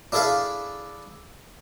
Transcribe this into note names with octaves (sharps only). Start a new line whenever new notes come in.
D4 E4 G#4 A4 E5 F5